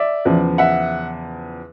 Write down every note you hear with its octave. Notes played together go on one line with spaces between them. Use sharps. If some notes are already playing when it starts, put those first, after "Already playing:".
Already playing: D5 E5
E2 C#3 F3
E5 F#5